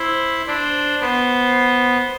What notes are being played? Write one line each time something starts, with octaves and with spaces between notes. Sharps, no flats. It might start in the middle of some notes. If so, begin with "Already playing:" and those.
Already playing: E4 C5
D4 C5
B3 C5